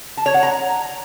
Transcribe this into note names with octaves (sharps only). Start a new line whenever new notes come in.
A5
C#5
F#5
A#5